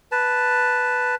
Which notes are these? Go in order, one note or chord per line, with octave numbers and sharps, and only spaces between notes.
B4 A5